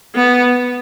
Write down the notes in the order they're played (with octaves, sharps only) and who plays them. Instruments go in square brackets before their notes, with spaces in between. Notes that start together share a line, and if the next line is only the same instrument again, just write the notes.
[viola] B3